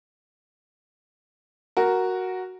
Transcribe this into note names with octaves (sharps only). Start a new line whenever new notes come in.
F#4 A#4